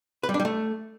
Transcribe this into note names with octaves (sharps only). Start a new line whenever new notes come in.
B4
G3
D4
G3
A3